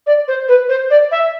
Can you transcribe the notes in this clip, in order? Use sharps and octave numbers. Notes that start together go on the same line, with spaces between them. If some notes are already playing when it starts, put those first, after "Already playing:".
D5
C5
B4
C5
D5
E5